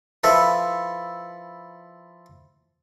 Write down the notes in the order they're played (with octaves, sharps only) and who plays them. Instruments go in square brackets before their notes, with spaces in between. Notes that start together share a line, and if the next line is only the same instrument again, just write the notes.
[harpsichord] F3 E4 A4 B4